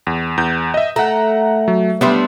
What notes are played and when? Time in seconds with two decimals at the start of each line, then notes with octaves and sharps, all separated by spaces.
0.07 E2
0.37 E2 G6
0.74 D#5 E5
0.96 A3 F#5 A#5
1.68 F#3
2.01 G3 B3 D4 G4 E5 C6